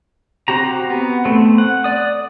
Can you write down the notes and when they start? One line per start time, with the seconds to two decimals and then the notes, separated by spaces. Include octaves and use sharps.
0.48 C4 F#4 G4 A#5
0.90 B3
1.25 A3 B3 C4
1.58 F#5
1.84 D5 D#6